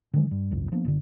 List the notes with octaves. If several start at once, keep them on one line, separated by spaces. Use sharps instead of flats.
D3 D#3 F#3 G#3
G2
G#1 C#2 F#2
F3 A#3 B3 D4
F#1 B2 D3